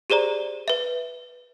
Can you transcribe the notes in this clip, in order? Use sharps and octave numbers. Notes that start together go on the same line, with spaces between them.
G4 G#4 C5 D5 A#5
B4 E5